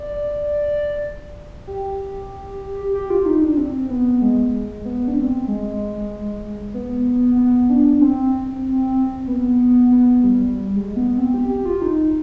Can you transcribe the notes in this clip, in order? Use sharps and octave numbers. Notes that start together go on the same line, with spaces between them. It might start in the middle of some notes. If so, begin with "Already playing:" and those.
Already playing: D5
G4
G4
F4
D#4
D4
C4
B3
G#3
B3
D4
C4
G#3
B3
B3
D4
C4
B3
B3
G3
G3
G#3
B3
C4
G4
G4
F4
D#4